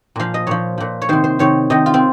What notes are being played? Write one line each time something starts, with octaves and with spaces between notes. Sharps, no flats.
A#2 F3 F5
D#5
A#2 F3 C#5
A#2 F3
C#5
C3 D#3 C5
C5
C3 D#3 C#5
C3 D#3 D#5
F4
C4